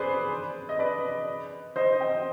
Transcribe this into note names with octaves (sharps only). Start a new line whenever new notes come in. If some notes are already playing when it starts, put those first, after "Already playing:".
Already playing: G#4 B4 C5 D5
D#5
B4 D5
C5 D#5
D#5 G5